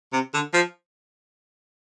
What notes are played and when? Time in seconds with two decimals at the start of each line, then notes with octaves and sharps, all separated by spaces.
0.13 C3
0.34 D3
0.54 F3